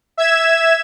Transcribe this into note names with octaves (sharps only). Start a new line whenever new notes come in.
E5 G#6 E7